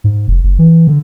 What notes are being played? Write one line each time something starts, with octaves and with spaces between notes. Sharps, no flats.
G#2
F1
F#1
E3
D3